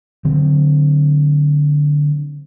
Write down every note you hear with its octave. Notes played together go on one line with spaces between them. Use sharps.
D3 F#3 C4